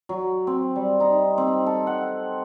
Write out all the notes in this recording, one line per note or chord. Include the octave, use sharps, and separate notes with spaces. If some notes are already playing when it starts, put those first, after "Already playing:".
F#3
C4
G3
D#4
C4
A4
F#5